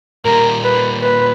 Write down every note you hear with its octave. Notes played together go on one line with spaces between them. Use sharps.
A#2 G3 A#3 A#4
B4
B4